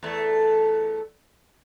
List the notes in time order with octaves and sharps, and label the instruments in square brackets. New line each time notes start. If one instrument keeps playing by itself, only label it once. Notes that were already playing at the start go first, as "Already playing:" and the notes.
[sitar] E2 A3